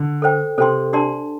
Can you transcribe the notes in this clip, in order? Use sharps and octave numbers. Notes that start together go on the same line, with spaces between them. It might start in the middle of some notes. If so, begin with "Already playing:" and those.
Already playing: D3
A4 C5 G5
C3 A4 C5 G5 C6
D4 G4 D5 A5 C6